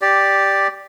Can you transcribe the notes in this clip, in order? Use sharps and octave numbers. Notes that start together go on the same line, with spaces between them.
G4 D5